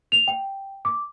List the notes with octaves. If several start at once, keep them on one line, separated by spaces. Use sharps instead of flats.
F7
G5
D6